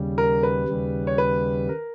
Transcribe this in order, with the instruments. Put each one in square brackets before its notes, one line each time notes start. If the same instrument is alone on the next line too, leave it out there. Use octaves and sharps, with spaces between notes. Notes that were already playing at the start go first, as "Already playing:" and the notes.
Already playing: [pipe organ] D#2 C#3 G3
[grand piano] A#4
B4
[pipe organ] D#2 C#3 G3
[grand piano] C#5
B4
A#4